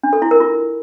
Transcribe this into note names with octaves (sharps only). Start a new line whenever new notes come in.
D4
A4
E4
A#4
F4